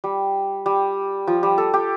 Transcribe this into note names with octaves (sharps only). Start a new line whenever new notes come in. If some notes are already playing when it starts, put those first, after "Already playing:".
G3
G3
F3
G3
A4
G4